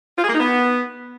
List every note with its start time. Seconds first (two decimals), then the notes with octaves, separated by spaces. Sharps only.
0.18 F4
0.23 G#4
0.29 A#3
0.34 D#4
0.40 B3